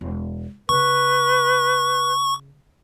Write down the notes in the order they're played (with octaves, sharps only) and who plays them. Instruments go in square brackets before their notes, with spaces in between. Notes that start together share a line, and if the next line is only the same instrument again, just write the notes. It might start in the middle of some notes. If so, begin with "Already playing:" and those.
[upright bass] E1
[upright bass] C#3 [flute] B4 [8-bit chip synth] C#6